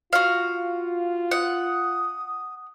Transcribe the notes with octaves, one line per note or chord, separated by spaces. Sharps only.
F4 F#4 F5
F#5 D#6